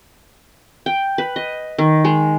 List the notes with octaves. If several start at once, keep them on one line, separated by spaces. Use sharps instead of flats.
G5
B4
D#5
D#3
G#3